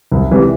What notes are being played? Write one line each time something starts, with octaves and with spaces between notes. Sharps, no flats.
C2
C3 E3 G3